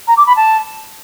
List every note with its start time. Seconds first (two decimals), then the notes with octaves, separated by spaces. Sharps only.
0.07 A#5
0.17 D6
0.27 B5
0.36 A5